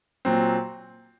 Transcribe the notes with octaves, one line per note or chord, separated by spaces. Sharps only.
A#2 F#3 C4